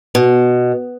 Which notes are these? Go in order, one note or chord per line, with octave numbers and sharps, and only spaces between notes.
B2